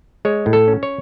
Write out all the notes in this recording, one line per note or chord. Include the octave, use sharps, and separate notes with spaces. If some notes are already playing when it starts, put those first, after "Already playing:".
G#3 C#5
A2
A4
C#4
C#5